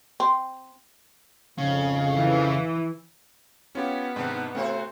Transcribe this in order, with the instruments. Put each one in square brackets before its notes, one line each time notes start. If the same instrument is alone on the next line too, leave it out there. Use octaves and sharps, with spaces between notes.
[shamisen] C4
[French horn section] F2 G#2 [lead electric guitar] C#3 [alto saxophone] F5
[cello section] E3
[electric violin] B3 [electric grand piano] C#4 F4 G4
[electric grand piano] G#2 C3 C4 [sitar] D#3 D4 D#4
[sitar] C3 F#4 C5 [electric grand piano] A3 C4